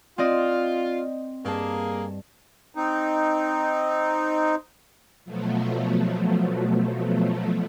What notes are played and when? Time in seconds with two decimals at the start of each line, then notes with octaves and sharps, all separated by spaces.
0.18 C4 F4 D5 D#5
1.45 G2 A#3 G#4 A5
2.75 C4 D#4
5.25 B2 F3 F#3 A3